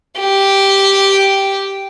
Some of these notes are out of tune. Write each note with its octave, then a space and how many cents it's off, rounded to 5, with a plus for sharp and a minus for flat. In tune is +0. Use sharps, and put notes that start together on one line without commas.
G4 -5